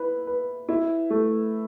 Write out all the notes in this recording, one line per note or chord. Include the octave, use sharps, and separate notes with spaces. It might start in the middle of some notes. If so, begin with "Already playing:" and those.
Already playing: E4 B4
B4
E4
A3